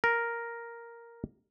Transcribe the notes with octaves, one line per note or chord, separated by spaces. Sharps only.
A#4